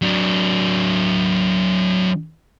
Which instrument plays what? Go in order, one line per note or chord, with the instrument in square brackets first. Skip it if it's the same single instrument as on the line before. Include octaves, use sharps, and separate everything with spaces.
[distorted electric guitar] F#3 D4